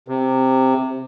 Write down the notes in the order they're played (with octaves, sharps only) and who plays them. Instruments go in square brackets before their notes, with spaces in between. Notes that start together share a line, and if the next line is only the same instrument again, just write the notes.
[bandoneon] C3